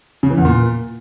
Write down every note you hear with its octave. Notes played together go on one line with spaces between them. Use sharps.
C#3
E3
E2
A#2